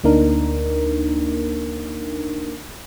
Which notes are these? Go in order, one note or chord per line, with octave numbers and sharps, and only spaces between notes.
D2 A#3 D4 D#4 A#4